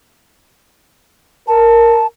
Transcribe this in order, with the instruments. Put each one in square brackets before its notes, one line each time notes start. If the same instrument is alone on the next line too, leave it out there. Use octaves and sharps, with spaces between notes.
[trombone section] A#4 [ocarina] A5